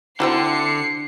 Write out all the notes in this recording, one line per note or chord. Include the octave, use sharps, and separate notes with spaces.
D3 C4 E4 F#4 C7 C#7